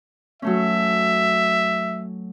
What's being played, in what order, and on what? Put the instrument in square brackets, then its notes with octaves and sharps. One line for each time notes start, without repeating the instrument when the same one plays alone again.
[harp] F#3 A3 C#4 [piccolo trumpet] E5